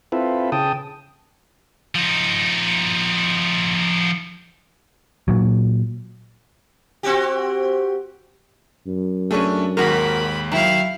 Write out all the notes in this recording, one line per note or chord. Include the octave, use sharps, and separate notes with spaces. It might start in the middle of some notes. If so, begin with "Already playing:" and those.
C4 E4 F4 A4 B4
C#3 G5 A5 D#6
F3 D#4
A#2 F#3
C4 F#4 G4
F#2
A3 C#4 D4 G#4 C#6
D#2 G#2 F#4 A#4 B5
D#3 F#3 E4 F5